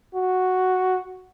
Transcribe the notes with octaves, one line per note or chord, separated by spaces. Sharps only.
F#4